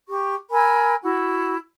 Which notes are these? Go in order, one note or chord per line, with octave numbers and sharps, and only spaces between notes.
G4 C#6
A#4 G#5 B5 E6
E4 F#4